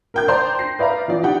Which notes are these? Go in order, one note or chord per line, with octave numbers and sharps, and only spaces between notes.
A#4 G5 G6
C5 D5 G5 A5 A#5 C6
A#6 C7
B4 D5 E5 F5 A#5
E3 F3 D5
D#4 G4 F#5 G5